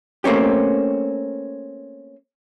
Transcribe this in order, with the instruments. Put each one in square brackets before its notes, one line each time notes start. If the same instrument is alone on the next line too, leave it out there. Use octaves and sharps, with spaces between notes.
[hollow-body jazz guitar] A3 A#3 C4 C#4 G4